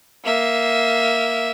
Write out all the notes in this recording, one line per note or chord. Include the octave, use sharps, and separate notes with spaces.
A#3 E5